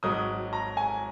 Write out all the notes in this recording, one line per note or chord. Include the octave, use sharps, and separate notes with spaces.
G#1 G#2 F#3 D#6
A#5
G#5